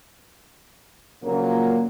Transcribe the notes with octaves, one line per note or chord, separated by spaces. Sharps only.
A#2 C#3 F3 F#3 A#3